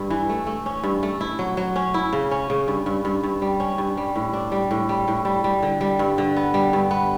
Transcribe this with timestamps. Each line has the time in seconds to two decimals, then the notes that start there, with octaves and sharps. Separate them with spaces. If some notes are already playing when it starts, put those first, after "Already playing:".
Already playing: G2
0.10 E3
0.29 A3
0.47 A3
0.66 C#4
0.84 G2
1.03 A3
1.21 E4
1.39 F#3
1.57 F#3
1.76 C#4
1.94 E4
2.13 C#3
2.31 C#4
2.50 C#3
2.68 G2
2.86 G2
3.05 G2
3.23 G2
3.42 G3
3.60 C#4
3.78 G2
3.97 G3
4.16 A2
4.33 D4
4.52 G3
4.71 A2
4.89 G3
5.08 A2
5.25 G3
5.44 G3
5.63 D3
5.81 G3
5.99 G2
6.18 D3
6.36 B3
6.54 G3
6.73 G2
6.91 B3